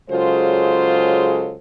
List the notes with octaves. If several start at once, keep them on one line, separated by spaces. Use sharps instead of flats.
C#3 F#3 G#3 F4 A4 C5